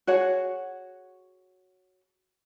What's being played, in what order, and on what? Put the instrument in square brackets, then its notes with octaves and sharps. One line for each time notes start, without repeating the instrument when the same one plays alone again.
[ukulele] F#4 G#4 C#5 F#5